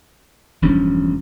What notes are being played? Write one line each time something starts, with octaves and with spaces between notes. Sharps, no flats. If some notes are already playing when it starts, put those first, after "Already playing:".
E1 G2 F3 C#4